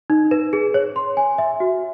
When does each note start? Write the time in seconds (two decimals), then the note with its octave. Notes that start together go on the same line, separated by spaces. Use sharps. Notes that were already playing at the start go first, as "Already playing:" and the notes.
0.10 D#4
0.31 B4
0.53 G#4
0.74 C#5
0.96 C6
1.17 G#5
1.38 E5
1.60 F#4